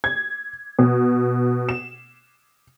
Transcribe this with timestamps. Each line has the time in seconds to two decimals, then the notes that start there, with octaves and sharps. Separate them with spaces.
0.04 G#6
0.79 B2
1.69 E7